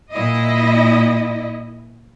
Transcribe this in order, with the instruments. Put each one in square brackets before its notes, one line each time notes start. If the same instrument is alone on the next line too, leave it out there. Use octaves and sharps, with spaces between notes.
[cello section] A#2 E4 D#5